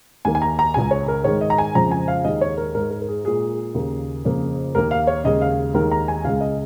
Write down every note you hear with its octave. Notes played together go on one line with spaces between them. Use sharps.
D#2 D#3 A#3 G#5
G#5
A#5
A#5
C#2 C#3 G#3 G#5
C#5
A#4
G#2 D#3 G#3 C#5
D#5
A#5
G#5
F2 C#3 F3 G#3 A#5
G#5
F5
D#2 D#3 G#3 D#5
C#5
A#4
G#2 G#3 A#4
A#4
A#4
G#4
A#2 G#3 G#4
D#2 C#3 A#3
F2 C#3 A#3
D#2 D#3 A#3 A#4
F5
C#5
D#2 C#3 G#3 D#5
F5
D#2 D#3 G#3 A#4
A#5
G#5
C#2 C#3 G#3 F5
D#5